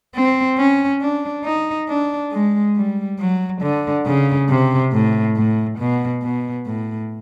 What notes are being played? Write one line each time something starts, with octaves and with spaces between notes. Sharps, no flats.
C4
C#4
D4
D#4
D4
G#3
G3
F#3
D3
C#3
C3
A2
A2
B2
B2
A2